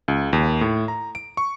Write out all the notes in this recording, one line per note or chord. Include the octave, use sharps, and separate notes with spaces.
C#2
D#2
A2
A#5
D7
C#6